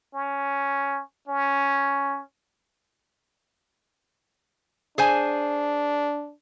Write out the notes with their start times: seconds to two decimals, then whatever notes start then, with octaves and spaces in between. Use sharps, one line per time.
0.14 C#4
1.28 C#4
4.98 D4 G#4 C5 G#5